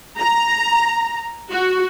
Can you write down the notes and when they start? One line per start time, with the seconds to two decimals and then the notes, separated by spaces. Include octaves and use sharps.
0.19 A#5
1.51 F#4